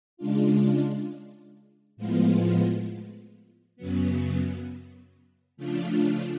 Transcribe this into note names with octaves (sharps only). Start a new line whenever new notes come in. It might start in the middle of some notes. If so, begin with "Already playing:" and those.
C#3 G#3 D4 F4
A2 F3 G#3 B3 F4
F#2 C#3 F#3 B3
C#3 F3 A3 D4 F4